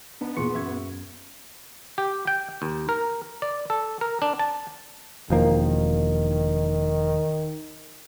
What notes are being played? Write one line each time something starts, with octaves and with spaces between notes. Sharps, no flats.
B3 D4 D#4
A#2 E3 G#4 C6 C#6 C#7
F#2 E5 C#6 G#6
G4
G5
D#2
A#4
D5
A4
A#4
D4
A5
E1 D#3 F3 A#3